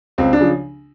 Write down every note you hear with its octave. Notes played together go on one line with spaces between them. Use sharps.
C#2 C4
D4
C#3 F3